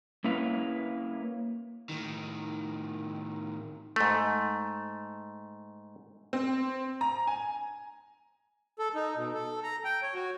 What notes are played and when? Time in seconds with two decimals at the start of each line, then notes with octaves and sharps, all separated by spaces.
0.24 A#3 C#4 E4 B4 F5
1.89 A2 D#3
3.96 G#2 A3
6.33 C4
7.01 A#5
7.27 G#5
8.79 A4
8.95 D#4
9.16 B2
9.34 A4
9.63 A#5
9.84 G5
10.02 C#5
10.14 F#4